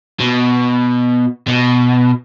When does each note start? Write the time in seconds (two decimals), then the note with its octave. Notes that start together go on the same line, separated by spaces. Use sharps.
0.20 B2
1.48 B2